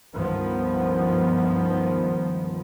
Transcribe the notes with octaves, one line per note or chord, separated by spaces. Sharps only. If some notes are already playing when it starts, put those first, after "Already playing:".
C#2 G2 D#3 F3 B3